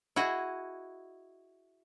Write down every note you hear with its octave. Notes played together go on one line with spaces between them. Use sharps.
E4 F#4 G#4 D#5